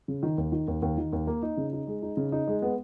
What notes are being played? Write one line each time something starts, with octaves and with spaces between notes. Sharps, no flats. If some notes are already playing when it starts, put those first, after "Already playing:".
C#3
D#3
D#2
D#3
D#2
D#2
D#3
D#2
A#3
D#4
C#3
D#4
G#3
D#4
C#3
D#4
G#3
B3